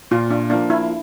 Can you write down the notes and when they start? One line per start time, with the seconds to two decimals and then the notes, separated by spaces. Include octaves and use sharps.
0.11 A#2 F4
0.31 D4
0.50 F3 A#3 D4
0.70 E4